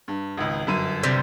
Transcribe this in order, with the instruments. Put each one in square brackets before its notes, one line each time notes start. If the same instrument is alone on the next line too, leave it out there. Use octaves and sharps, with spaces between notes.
[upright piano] G2
G#1 C#2
G1 F#2 D#7
[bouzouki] C3 G3